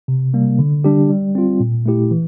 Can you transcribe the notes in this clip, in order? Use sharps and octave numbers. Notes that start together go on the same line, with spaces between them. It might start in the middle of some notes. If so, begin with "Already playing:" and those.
C3
G3 A#3
D3
G3 D4 G4
G3
C4 F4
A#2
A3 E4 G4
E3